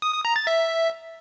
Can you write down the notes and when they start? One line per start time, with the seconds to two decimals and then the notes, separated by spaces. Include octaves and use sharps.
0.02 D#6
0.13 D#6
0.25 A#5
0.36 A6
0.47 E5